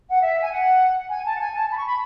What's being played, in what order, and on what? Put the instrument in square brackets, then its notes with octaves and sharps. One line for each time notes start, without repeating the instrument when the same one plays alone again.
[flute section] F#5
E5
G#5
F#5
G#5
A5
F#5
G#5
A5
B5
C#6
B5